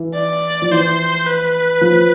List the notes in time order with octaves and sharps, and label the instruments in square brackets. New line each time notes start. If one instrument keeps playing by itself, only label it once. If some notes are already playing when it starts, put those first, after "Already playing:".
Already playing: [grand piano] E3
[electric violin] D5
[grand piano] F3
[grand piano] E3 [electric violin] C5
[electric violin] B4
[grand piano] F3